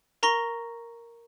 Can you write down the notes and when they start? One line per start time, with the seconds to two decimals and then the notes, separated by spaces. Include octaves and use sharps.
0.23 A#4 A#5 C#6 A#6 G7